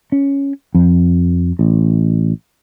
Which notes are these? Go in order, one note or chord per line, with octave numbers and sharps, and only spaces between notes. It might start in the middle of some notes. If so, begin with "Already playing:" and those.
C#4
F2
A1